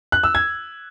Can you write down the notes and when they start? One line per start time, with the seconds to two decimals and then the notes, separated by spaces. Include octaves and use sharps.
0.12 F#6
0.23 E6
0.35 G#6